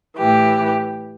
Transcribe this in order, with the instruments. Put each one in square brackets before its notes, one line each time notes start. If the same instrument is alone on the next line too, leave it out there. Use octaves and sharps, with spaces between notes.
[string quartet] A2 E3 G4